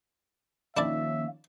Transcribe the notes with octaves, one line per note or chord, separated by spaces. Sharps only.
D#3 F3 A#3 C#4 D4 E4 D5 E5